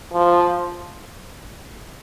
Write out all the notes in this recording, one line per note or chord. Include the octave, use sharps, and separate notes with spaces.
F3